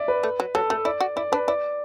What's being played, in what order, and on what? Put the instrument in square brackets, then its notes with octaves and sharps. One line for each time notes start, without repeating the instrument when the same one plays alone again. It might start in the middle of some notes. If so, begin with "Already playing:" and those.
Already playing: [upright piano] D5 E5
B4
[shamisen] A3
F#3
[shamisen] F#3 [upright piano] A4
[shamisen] A3 [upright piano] A4
[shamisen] E4 [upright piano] D5
[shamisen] F#4
[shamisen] E4 [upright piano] D5
[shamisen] D4 [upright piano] B4
[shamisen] E4 [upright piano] D5